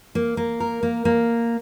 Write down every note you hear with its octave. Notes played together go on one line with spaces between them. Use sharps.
A#3
A#3
A#4
A#3
A#3